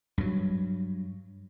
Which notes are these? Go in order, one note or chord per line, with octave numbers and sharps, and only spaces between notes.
G2 F#3